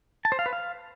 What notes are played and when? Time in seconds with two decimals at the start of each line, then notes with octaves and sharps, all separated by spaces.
0.25 A5
0.32 C5
0.39 F5
0.46 B4
0.53 F5